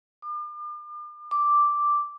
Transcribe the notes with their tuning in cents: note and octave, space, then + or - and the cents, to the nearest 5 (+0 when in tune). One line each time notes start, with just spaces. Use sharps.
D6 +40
D6 +0